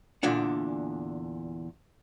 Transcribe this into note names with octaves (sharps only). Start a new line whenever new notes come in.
E2 A#2 D3 D4 F#5